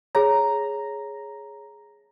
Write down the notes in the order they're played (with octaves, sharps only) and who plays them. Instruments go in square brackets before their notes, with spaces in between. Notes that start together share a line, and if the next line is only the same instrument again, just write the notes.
[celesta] G#4 C#5 [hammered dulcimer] A#5